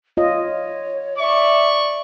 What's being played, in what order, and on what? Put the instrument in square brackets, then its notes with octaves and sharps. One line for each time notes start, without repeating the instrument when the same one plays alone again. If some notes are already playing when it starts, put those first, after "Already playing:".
[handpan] F4 D#5 [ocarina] C#5
[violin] D5 [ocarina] E5 [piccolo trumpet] C#6